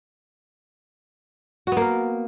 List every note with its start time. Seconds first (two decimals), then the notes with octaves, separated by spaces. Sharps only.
1.67 F#4
1.72 B3
1.77 A#3
1.81 A#4